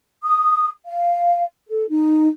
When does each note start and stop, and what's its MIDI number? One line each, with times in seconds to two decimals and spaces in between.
0.23 0.67 87
0.87 1.43 77
1.69 1.83 69
1.90 2.27 63